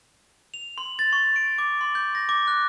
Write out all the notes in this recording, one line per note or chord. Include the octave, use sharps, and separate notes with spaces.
F7
C6
A6
C#6
D7
D6
C6
G6
A#6
D6
F#6